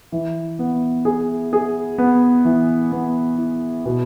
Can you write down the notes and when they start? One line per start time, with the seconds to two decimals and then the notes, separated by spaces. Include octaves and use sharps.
0.12 E3
0.59 B3
1.05 G#4
1.53 G#4
1.98 B3
2.45 E3
2.92 B3
3.38 E4
3.86 B2